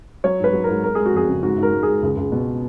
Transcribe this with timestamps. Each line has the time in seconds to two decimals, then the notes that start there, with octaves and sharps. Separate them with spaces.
0.24 F#3 C#5
0.40 G#2 B4
0.53 F#3
0.64 G#2 A#4
0.84 G#3 A#4
0.95 G#3 G#4
1.06 F#4
1.14 F2 G#4
1.28 C#3
1.42 G#2 F#4
1.58 G#2 A#4
1.73 G#2
1.83 G#3 G#4
2.03 C#2
2.17 C#2
2.32 B2